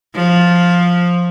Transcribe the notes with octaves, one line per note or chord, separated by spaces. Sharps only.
F3